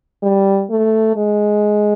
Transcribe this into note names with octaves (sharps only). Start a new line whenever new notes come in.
G3
A3
G#3